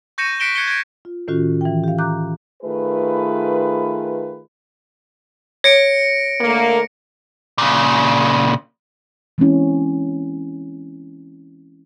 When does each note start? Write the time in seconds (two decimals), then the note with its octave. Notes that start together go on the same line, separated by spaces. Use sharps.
0.18 C#6 G6 A#6 C#7 D#7 E7
0.40 F#6 B6 C#7 D7 E7 G7
0.55 F#6 G#6 C#7 G7
0.68 G#6 D7
1.05 F4
1.28 A2 D#3 C#4 F4 F#4
1.61 E3 G5
1.84 G4 F5
1.98 A#5 D6 F#6 G6
2.62 D#3 A3 F4 G#4 B4
5.64 C#5 A#6 C#7 D7
6.41 D3 A3 A#3
7.58 A#2 C#3
9.38 E3 G#3 A#3 C4 C#4 E4